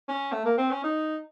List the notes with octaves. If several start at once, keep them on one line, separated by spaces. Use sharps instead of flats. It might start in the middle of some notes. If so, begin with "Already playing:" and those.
C#4
A3
A#3
C4
C#4
D#4